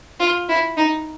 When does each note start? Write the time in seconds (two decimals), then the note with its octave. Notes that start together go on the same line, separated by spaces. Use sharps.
0.20 F4
0.49 E4
0.77 D#4